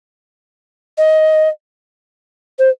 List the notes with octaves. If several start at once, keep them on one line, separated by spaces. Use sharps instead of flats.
D#5
C5